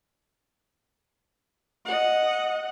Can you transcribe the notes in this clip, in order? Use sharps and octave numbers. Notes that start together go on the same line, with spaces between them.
D#5 F#5